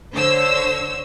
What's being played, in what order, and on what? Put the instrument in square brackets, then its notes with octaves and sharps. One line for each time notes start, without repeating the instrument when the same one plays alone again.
[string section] D3 C5 C#5 E6